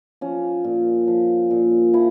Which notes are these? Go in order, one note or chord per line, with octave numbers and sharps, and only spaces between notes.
F3 C#4
A#2
F3
A#2
F3 E4